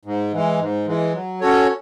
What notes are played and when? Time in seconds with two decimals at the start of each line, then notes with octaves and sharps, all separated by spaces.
0.05 G#2
0.33 E3 G#3
0.59 G#2
0.86 E3 G#3
1.14 F#3
1.41 C#4 F#4 A4 C#5